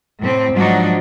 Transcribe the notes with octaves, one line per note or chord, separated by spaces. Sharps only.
A2 C3 C4
G#2 F3 F#3 D4 D#4 F#4